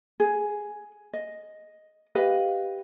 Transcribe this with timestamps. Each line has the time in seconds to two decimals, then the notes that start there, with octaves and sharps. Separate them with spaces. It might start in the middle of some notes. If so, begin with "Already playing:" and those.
0.20 G#4
1.13 D#5
2.15 G4 B4 D#5 F5